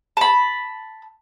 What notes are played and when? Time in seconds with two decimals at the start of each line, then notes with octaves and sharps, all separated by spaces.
0.17 A5 B5